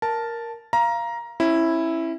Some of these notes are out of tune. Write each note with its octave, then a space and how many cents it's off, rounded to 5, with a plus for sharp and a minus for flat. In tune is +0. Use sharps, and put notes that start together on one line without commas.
A#4 +0 A5 +0
F5 -20 A#5 +15
C#4 -35 E4 +0